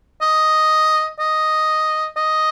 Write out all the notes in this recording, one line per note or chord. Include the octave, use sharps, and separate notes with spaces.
D#5
D#5
D#5